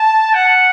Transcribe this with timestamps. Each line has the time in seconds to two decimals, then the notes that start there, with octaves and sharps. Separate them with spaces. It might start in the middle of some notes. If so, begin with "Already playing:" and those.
Already playing: A5
0.34 F#5